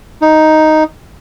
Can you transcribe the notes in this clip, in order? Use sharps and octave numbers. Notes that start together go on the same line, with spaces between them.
D#4